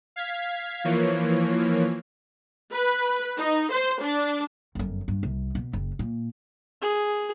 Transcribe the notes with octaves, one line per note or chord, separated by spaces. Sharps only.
F5 G#6 B6
E3 F3 A#3 C#5
B4
D#4
C5
D4
G1 F#2
G2
C2
B2
F#1
A#2
G#4